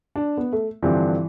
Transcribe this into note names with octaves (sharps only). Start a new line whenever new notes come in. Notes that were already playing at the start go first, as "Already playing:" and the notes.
D4
B3
A3
G2 D3 E3 F3 C4 G4